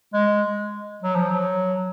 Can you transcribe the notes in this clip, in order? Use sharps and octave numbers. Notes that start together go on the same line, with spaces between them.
G#3
F#3
F3
F#3